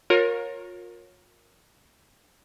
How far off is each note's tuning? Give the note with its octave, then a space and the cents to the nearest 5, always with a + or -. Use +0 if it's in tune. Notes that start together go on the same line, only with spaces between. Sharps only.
F4 +35 A#4 +0 C#5 -15